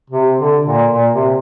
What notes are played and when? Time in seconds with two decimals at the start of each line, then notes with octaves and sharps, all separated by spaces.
0.10 C3
0.38 D3
0.66 A#2
0.93 A#2
1.14 C3